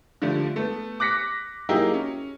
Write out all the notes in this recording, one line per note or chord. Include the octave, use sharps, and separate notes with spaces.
D3 F3 G3 A3
A3 B3
D6 F#6 A#6 B6 C#7
F#3 A#3 D#4 E4 G4 G#4
C#4